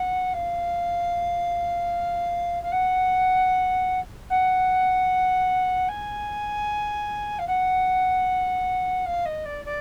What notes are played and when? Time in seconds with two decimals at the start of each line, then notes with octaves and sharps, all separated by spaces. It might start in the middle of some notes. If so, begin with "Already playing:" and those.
Already playing: F#5
0.33 F5
2.63 F5
2.72 F#5
4.30 F#5
5.88 G#5
7.39 F5
7.47 F#5
9.06 F5
9.25 D#5
9.45 D5
9.65 D5